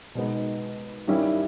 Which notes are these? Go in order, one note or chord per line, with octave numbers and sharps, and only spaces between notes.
B2 G#3 B3 D#4
G2 D#3 G3 C#4 E4